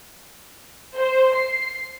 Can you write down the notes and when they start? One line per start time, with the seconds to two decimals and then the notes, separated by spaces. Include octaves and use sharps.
0.95 C5
1.33 C7